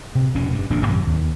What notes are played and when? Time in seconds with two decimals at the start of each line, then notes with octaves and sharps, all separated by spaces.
0.15 C3
0.35 F1 B2 C#4
0.52 G2
0.70 D#1 A#1 A#2 D4
0.86 F#2 C3 D#3 F#3
1.07 D#2